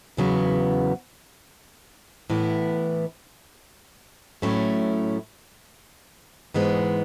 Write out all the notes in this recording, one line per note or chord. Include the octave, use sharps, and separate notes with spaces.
E2 C#3 F#3 B3 E4
A2 E3 B3 E4
A2 F#3 A3 C#4 E4
G#2 E3 G#3 B3